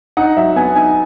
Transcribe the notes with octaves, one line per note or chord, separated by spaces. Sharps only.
D#4 F#5
F#3 E5
B3 G#5
D#4 G#5